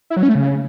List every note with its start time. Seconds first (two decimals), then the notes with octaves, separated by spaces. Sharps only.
0.10 E4
0.17 F#3
0.23 C#4
0.29 A3
0.35 C#3